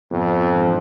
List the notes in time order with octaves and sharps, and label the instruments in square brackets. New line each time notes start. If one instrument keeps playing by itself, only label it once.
[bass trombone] F2 [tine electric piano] G#2 F3 B3
[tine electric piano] G#2 E3 G#3 D4